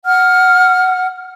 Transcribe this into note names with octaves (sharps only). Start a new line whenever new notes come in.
F#5 F6